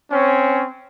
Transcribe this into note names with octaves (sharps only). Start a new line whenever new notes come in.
C4 C#4